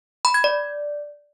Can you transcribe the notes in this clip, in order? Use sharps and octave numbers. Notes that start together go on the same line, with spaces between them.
B5
G#6
D5